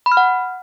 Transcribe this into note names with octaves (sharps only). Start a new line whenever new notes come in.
B5
F6
F#5